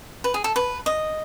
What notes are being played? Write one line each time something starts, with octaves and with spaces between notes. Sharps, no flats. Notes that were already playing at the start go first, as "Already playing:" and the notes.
B4
G#4
A4
B4
D#5